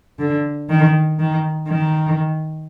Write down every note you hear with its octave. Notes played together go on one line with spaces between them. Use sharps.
D3
D#3
D#3
D#3